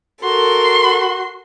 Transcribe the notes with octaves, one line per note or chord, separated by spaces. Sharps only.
F#4 A4 A#4 C6